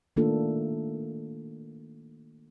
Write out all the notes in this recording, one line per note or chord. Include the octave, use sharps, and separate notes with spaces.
D#3 A3 A#3 D4 F4 A4